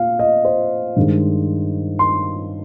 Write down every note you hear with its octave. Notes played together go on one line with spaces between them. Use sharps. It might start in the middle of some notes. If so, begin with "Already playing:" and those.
Already playing: A#2 F5
D#5
C5
G2 D#3 G#3
C6